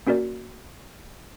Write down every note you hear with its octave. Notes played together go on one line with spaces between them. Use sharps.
A#3 C#4 F#4 A#4 D5